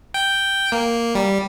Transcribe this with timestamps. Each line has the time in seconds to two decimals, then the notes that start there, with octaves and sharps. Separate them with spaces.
0.14 G5
0.72 A#3
1.15 G3